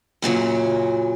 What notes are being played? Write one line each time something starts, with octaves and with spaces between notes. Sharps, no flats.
F#2 A#2 C#3 F#3